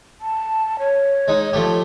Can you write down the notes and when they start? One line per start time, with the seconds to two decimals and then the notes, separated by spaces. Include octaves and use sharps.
0.21 A5
0.79 C#5
1.28 G#3 D#4
1.53 F3 A3 G4